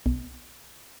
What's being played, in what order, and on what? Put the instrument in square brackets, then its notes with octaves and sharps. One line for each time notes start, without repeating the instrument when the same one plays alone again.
[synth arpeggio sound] B1